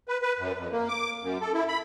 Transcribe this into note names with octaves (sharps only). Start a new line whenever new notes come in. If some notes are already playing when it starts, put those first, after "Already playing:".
B4
B4
F#2
F2
A#3
D6
F#2
A4
E4
B5